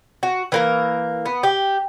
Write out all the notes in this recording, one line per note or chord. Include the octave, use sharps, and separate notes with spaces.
F#4
E3 A#3 A#4
B3
G4